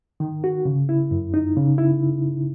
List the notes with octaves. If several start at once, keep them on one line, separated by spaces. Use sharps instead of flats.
D#3
F#4
C#3
E4
F#2
D#4
C#3
E4